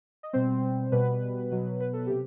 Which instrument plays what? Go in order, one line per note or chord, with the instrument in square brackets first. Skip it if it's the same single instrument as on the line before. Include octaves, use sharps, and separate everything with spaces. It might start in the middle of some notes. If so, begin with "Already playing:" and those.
[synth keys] D#5
B2 G3 C4 C5
B2 G3 B3 B4
B2 F#3
B4
A4
C3 G4